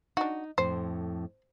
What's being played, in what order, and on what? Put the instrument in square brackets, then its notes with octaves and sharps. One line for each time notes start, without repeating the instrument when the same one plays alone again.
[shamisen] D4 F#4 [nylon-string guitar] D#4
[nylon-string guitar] F2 A2 [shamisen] C5